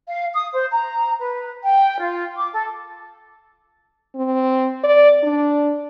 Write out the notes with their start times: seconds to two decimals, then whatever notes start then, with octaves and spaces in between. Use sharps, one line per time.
0.08 F5
0.33 D#6
0.53 C5
0.71 A#5
1.21 B4
1.64 G5
2.00 F4
2.36 D6
2.54 A4
4.16 C4
4.84 D5
5.23 D4